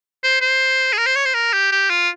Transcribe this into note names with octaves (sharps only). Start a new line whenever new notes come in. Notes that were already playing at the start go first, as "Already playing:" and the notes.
C5
C5
G#4
A#4
C5
C#5
C5
A#4
G4
G4
F4